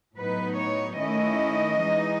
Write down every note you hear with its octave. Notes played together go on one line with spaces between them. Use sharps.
A2 F#3 B3 D#4 B4
C#5
D#3 A3 C#4 E4 D#5
E3 G#3 D#4